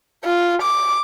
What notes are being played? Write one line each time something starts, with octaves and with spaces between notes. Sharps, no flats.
F4
D6